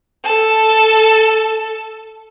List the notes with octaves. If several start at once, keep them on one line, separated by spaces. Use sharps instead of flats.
A4 A5